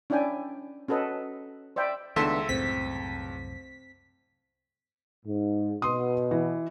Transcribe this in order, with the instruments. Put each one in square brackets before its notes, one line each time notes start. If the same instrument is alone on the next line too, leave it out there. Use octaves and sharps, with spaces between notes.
[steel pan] C#4 D4 E4 D5 G5 G#5
C#4 F#4 A4 B4 D#5
C5 D5 E5 G5 B5
[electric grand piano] C#2 A4 C6 [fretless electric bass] D#3 [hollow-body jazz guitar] A3 B3 D4 [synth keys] E5
[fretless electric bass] C2 F#2 A2 [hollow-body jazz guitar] C4 [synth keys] B6
[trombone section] G#2
[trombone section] B2 [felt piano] C6 D#6
[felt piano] E3